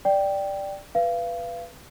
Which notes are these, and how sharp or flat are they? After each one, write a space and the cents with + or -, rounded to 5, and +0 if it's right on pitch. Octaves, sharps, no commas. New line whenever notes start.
D5 +0 G5 +0
B4 +0 F5 -30